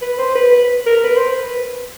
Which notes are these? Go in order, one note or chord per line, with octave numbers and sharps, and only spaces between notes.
B4
C5
B4
B4
A#4
B4
C5
B4